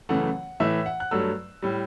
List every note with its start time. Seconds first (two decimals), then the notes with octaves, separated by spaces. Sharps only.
0.09 F#2 C#3 E3 A3 F#5
0.60 A2 E3 A3 E5
0.86 F#5
1.00 F#6
1.11 G2 F#3 A3 E6
1.62 A2 G3